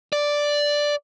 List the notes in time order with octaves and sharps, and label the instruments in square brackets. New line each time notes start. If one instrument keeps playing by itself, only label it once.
[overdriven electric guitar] D5